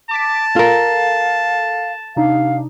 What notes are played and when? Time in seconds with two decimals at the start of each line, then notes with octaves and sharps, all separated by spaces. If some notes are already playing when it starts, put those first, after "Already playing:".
0.11 A5 D6 B6 D7
0.56 F4 A4 A#4 F5
2.16 C3 D4 D#4 F5